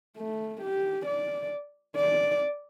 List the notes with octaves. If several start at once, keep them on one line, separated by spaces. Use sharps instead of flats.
A3
G4
D5
D5